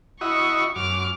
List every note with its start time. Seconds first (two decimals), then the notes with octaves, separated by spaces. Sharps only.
0.21 E4 F#4 D#5 C#6
0.76 F#2 D6 F6